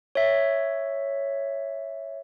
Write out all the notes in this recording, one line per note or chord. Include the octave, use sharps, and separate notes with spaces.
C#5 E5